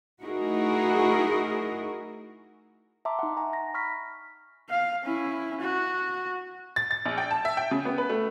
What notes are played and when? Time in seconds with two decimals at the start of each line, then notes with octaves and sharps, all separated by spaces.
0.22 A3 D#4 E4 F#4 G#4 A#4
3.05 E5 A5 A#5 C6 D6
3.19 D#4 F#5
3.37 G#5 A#5 C#6
3.53 A#6
3.74 B5 C#6 F6 A#6 B6
4.70 F5
5.03 C#4 E4
5.61 F#4
6.76 A6
6.91 A6
7.05 A#1
7.18 G5
7.31 A5
7.45 E5
7.57 G5
7.71 C#3
7.85 B3
7.98 B4
8.09 A3